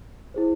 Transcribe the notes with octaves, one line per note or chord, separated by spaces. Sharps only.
E4 G#4 C5